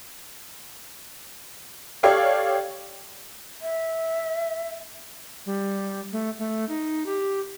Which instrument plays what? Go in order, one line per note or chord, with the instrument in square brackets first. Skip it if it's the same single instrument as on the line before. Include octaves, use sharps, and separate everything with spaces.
[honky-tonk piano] G4 A4 C#5 D5 F5 G5
[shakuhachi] E5
[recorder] G3
A3
A3
D#4
G4